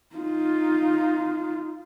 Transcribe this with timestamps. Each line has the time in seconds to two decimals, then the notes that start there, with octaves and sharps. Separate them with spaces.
0.16 D#4 F4